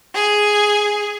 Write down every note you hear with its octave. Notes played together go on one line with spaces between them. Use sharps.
G#4